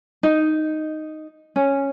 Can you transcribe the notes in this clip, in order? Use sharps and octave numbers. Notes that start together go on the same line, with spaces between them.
D#4
C#4